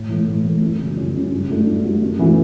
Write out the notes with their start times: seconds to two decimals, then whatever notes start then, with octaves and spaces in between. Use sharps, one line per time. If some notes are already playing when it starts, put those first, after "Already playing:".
Already playing: A2
0.09 E3 A3
0.27 A2
0.44 E3 A3
0.62 F#2
0.79 C#3 F#3 C#4
0.97 F#2
1.14 C#3 F#3 C#4
1.32 G2
1.49 F#3 A3 D4
1.67 G2
1.84 F#3 A3 D4
2.02 F#2
2.19 E3 A3 C#4 F#4